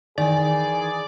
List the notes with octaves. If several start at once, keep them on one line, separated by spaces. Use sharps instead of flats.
D#3 E3 G#4 D5